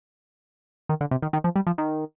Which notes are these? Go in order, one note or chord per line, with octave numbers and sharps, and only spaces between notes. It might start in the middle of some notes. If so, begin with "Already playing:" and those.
D#3
D3
C3
D#3
D#3
F3
G3
F3
D#3